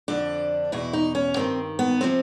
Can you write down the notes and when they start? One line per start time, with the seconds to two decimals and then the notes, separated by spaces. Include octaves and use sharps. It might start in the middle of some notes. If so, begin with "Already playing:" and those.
0.08 F2 D3 F3 D4
0.72 E2 B2 E4
0.93 D#4
1.15 C#4
1.36 G2 D#3 C4
1.79 B3
2.01 C3 F3 C4